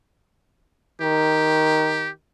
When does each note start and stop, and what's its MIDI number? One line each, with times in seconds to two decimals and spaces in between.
1.01 2.13 51
1.01 2.09 67